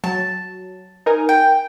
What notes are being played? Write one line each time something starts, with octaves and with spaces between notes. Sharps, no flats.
F#3 A5
D#4 A#4 G#5
G5